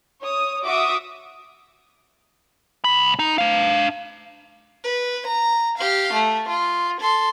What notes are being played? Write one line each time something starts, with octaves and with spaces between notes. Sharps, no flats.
C#5 D#6
F#4 E5 D6 D#6 D7
C2 B5
D#4
D4 F5
B4
A#5
G4 F5
A3
F4
A4 C6